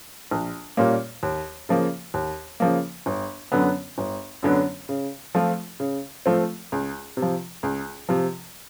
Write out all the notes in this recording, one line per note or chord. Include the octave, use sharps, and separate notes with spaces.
A#1
A#2 G3 A#3 C#4
D#2
C#3 F3 A#3
D#2
C#3 F3 A#3
G1
F#2 D3 F#3 B3
G1
F#2 D3 F#3 B3
C#3
F3 A3 C4 F4
C#3
F3 A3 C4 F4
C#2
C3
F3
C#2
C3 F3